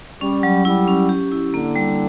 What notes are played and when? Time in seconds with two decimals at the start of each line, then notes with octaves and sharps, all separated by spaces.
0.21 G3 C#4
0.43 F#3
0.65 G3 E4
0.87 C#4
1.09 G4
1.31 E4
1.54 D3 A#3
1.76 G3